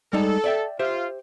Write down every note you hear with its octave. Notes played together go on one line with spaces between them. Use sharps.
G3 G#3 D#4 A4
D5 E5 G5
F4 G4 C5 E5